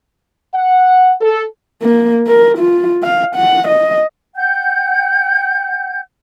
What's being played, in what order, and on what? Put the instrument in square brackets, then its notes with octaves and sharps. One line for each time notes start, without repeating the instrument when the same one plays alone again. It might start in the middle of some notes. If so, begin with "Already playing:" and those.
[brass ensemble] F#5
A4
[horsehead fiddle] A#3
A#4
F4
F5
F#5
D#5
[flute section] F#5 G5 G6